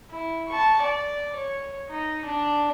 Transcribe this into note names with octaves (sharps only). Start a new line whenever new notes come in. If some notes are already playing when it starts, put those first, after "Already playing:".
E4
A5 C#6
D5
C#5
D#4
D4